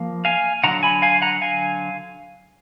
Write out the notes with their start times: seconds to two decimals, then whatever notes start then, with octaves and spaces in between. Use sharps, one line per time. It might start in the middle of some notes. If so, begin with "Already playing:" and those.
Already playing: F3 A#3
0.25 F5 G#5
0.64 D3 F#3 D4 F#5 A#5
0.83 G#5 B5
1.02 F5 G#5
1.22 F#5 A#5
1.41 F5 G#5